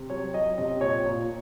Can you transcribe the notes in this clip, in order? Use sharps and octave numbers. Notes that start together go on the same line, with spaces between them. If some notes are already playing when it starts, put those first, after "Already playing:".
Already playing: C3
F#3 C#5
F#3 D#5
C3 D#5
A#2 C#5
A#2